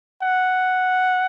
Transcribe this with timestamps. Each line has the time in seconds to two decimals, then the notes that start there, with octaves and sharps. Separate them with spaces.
0.23 F#5